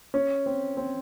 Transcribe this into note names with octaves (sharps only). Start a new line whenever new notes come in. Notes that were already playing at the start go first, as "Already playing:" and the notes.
C#4
C4
C4